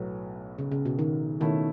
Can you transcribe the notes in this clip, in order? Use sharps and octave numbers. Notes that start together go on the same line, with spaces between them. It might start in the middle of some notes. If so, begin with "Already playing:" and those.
Already playing: B1 A2 F#3 B3
C#3
C#3
B2
D#3
B2 D#3 A3 C#4 E4